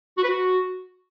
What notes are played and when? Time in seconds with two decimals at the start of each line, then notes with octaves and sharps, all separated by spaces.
0.17 F#4
0.23 B4
0.28 F#4